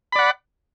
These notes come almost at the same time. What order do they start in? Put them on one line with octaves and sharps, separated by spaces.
B5 D5 F#5